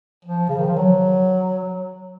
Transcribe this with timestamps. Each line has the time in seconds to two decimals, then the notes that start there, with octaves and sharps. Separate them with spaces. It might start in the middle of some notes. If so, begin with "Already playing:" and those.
0.25 F3
0.49 C#3
0.58 D#3
0.68 F3
0.76 F#3